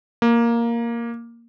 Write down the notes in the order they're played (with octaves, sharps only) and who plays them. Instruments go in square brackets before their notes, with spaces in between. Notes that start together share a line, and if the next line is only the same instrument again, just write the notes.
[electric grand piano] A#3